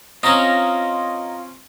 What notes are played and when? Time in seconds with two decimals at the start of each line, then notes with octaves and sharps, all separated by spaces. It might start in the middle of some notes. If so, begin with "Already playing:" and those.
0.23 C4 C#4 F4 C#5 D#5 A#5